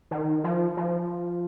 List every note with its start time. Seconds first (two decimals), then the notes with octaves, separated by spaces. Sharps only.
0.11 D#3
0.44 F3
0.77 F3